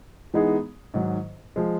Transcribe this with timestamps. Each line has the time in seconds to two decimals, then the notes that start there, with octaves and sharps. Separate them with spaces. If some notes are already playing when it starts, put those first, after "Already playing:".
0.34 E3 G#3 B3 D#4 G#4
0.94 G#2 D#3 F#3
1.56 F3 G#3